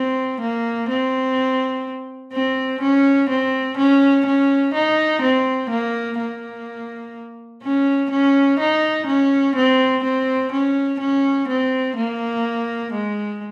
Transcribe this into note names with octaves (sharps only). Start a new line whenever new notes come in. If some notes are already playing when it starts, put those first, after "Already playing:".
Already playing: C4
A#3
C4
C4
C#4
C4
C#4
C#4
D#4
C4
A#3
A#3
C#4
C#4
D#4
C#4
C4
C4
C#4
C#4
C4
A#3
G#3